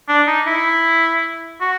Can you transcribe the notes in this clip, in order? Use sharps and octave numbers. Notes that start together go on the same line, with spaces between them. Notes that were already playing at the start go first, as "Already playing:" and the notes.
D4
D#4
E4
F#4